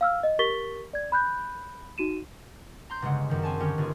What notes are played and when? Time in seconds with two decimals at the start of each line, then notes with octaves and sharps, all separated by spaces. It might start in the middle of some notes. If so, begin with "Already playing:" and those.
0.01 F5 E6 F6
0.23 D#5
0.39 G4 A#4 C#6 A6 B6 G7
0.93 D5 G#6
1.12 B5 F#6 G6
1.98 D#4 F#4 D#7 E7
2.90 A#5 C6 G6
3.02 G1 C#3 G#3 F#5
3.30 F#2 D#3
3.43 C4 G#5 A5
3.60 D3 D#3 C#4 G4 A#4 C#5
3.78 G1 F4 G#4